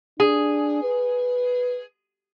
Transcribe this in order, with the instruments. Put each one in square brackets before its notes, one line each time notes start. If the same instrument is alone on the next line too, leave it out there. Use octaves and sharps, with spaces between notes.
[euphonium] D4 [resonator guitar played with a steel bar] G#4
[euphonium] B4